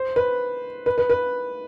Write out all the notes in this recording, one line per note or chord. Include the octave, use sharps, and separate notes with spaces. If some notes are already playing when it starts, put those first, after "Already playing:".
Already playing: C5
B4
B4
B4
B4